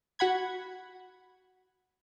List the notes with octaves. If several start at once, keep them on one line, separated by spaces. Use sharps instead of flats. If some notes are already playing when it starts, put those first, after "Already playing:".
F#4 F#5 B5 G#6